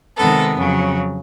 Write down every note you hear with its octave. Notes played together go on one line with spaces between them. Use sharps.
C3 D#3 G#3 B3 A4
F2 C#3 F#3